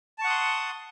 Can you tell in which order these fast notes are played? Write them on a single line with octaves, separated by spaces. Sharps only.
A5 C#6 F#5 D#6 C6